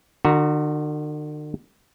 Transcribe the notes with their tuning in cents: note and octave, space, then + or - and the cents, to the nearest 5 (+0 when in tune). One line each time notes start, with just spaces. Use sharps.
D3 +45 F#4 +0 A#5 +0